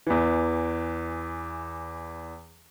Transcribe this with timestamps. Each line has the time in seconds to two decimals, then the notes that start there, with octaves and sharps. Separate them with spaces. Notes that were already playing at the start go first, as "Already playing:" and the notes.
0.07 E2 E3